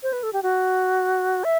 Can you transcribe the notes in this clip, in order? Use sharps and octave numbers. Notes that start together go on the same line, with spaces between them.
C5
B4
A4
G4
F#4
E5